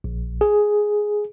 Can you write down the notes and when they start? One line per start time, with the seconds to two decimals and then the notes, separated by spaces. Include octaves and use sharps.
0.04 A#1
0.41 G#4